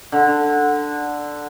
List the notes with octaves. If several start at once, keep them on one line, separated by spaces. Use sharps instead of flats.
D3